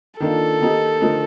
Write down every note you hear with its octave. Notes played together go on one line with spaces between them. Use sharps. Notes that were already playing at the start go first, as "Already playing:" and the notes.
D#3 A#3 D4 F4 A4
D#3 A#3 D#4 G4
D3 F3 A3 D#4 A#4